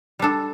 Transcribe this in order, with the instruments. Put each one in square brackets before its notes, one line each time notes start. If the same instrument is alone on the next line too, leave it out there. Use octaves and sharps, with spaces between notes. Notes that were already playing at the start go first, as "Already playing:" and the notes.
[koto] G3 D4 A4